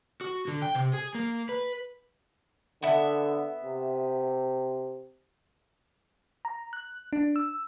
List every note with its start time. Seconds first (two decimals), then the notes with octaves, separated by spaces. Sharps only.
0.21 F#4
0.48 D3
0.62 G5
0.75 C3
0.93 G#4
1.15 A#3
1.49 B4
2.82 D3 B3 E5
3.63 C3
6.45 A#5
6.73 F#6
7.13 D4
7.36 E6